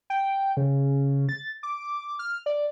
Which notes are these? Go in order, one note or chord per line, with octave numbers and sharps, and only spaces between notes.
G5
C#3
A6
D6
F6
D5